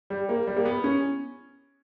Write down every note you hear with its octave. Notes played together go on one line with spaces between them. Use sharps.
G3
A#3
G3
A#3
B3
C#4